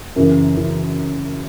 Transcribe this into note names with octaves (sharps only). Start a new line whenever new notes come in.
F#2 C#3 E3 A#4
C#3 E3